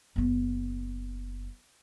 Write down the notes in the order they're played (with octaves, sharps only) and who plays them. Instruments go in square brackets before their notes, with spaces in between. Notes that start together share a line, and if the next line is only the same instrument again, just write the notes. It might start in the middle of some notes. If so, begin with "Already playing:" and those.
[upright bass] F#1 B3